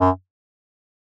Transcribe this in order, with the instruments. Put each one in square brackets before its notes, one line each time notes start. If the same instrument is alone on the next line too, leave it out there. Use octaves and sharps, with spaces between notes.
[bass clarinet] F#2